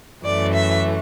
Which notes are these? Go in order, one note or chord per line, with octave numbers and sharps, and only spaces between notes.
F#2 E3 A3 D5
E5